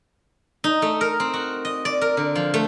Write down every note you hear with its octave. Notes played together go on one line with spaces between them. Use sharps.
D#4
A3
A#4
C4
F#4
D#5
D5
A#4
D3
F3
A3